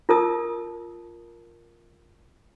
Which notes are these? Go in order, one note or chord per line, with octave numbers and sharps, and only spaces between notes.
F4 A#4 A5 D#6